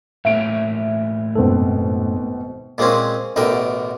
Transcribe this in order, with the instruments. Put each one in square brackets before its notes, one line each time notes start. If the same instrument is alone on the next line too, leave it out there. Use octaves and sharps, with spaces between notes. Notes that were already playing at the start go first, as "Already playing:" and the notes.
[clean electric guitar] A2 A#3 C#4 [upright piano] E5 D7
[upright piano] G#1 B2 C4 [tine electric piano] F#2 A4
[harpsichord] A#2 G#3 A#3 C4 C#4
A1 B2 D3 A#4 G5